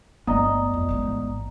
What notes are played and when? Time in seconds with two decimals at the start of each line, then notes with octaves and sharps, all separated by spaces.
0.27 G1 A2 B3 D5 D#5 A#5 D#6
0.74 F2
0.89 A1 G#2